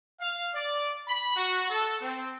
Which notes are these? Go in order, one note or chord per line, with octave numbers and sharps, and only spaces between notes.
F5
D5
B5
F#4
A4
C4